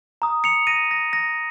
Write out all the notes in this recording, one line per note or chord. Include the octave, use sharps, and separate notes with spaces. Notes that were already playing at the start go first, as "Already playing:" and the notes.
A#5 D#6
C#7 F7
A#6 D#7
A#6
A#6